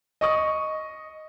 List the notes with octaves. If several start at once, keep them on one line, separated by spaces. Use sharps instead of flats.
D#5 C#6 D#6